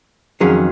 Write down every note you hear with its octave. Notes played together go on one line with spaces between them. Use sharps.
F2 D#3 F#3 C#4 G#4